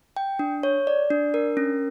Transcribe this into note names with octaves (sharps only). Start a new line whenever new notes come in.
G5
D4
C#5
D5
D4
A#4
C#4